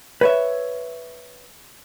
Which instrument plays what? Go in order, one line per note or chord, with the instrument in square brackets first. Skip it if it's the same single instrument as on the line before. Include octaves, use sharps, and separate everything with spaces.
[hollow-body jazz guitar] B4 C#5 E5